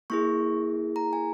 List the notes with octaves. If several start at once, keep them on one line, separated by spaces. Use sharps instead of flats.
A#3 E4 G#4 C#6
A#5
G#5